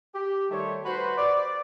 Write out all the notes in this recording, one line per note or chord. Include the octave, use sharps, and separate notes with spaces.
G4
D#3 G3 A3 C5 C#5
F#4 B4 C5
D5